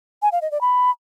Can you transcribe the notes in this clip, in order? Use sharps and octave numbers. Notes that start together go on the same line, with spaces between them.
G#5
F5
D#5
D5
B5